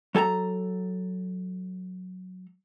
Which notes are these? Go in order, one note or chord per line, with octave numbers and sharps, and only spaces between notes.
F#3 A4 G#5 A#5